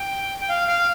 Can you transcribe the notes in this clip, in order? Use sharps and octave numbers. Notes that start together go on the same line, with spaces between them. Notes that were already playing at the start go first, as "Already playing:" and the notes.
Already playing: G5
G5
F5
F5